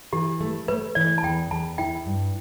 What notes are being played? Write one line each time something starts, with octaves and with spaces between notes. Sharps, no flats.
E3 G4
A3
A3 B4
E3 D5
A5
E2 G5
E2 A5
E4 G5
G2